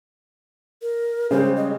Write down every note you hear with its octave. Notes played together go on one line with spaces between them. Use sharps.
A#4
C#3 G3 G#3 C5
D#5